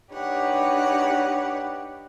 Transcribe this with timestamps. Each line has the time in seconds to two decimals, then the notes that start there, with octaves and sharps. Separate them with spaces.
0.12 D4 D#4 G4 B4 C#5 F#5